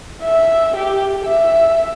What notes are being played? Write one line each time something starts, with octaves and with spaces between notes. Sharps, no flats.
E5
G4
E5